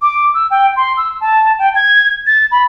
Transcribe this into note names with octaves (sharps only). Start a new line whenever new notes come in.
D6
E6
G5
C6
E6
A5
G5
G#6
A6
B5